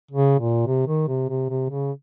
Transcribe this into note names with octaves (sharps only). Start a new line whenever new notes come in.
C#3
A#2
C3
D#3
C3
C3
C3
C#3